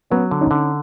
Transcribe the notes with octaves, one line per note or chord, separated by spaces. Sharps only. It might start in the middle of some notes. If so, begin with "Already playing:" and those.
F#3 B3 C#4
D3
C#4 D#4
D3